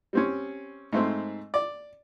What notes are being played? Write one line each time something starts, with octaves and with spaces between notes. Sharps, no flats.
G3 C4 C#4
G#2 A3 C4
D5